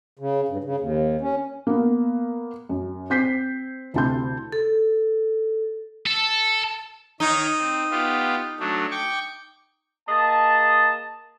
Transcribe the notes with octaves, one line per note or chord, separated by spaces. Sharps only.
C#3
G2
C#3
D#2
C#4
A#3 B3
F#2
C4 G6 B6 C7
D2 C3 E4 A5 C6 G6
A4
A4
D#3 D#4 C#5
C4
B3 F4 G4
F#3 A3 D4
G5 C#6 D6
A#3 G#4 D#5 A5